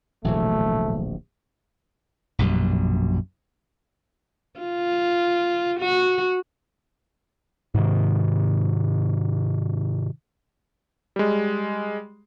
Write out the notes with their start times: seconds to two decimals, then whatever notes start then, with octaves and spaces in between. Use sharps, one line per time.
0.24 D1 A#1 B2 E3 F#3 A3
2.39 A#1 F#2 B2 G3
4.60 F4
5.80 F#4
7.75 G#2 C3 D#3
11.16 G3 G#3